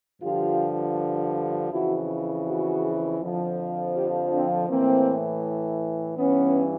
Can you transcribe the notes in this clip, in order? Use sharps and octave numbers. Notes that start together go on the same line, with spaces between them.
G2 D3 F3 F4 G4
F2 C#3 E3 E4 F#4
F#4 G#4
F2 D3 F3
F4 G4
C4 D4
A2 E3 A#3 C4
G2 E3 B3 C#4